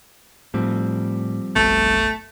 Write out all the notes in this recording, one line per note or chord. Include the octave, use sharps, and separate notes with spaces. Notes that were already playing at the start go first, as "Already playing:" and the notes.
A2 F3 G3 C4
F#1 B1 B2 A3